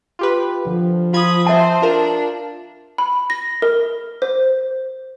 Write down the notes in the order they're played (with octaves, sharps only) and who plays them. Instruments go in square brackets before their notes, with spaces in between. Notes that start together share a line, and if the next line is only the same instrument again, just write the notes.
[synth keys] F4 G4 B4
[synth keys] D3 [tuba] F3
[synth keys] F4 G#6 [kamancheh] B5 D#6
[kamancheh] C4 C5 [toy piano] E5 A5
[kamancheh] D4 [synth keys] F4 A#4
[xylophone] B5
A#6
A#4
C5